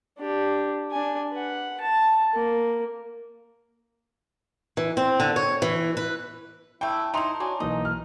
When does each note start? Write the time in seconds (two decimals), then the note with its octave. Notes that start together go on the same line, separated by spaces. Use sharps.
0.18 D4 G4
0.92 D4 G#5
1.31 B4 F#5
1.80 A5
2.34 A#3
4.77 E3
4.97 C4
5.20 D3
5.36 C#5
5.62 E3
5.97 B4
6.81 E3 A3 E4 G5
7.14 A3 D#4 E4 A#5 C6 F7
7.40 D4 F#4 C#5 G#5
7.60 B1 E3 A#3 D#4 D#5
7.85 F6